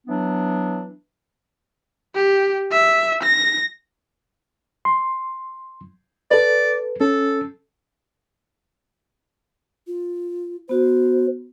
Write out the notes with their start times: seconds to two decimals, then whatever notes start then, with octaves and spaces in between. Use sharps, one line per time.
0.07 E3 F#3 B3 D4
2.14 G4
2.72 E5
3.23 A#6
4.85 C6
6.31 A4 B4 D5
7.01 C#4 A4
9.87 F4
10.69 B3 F#4 C5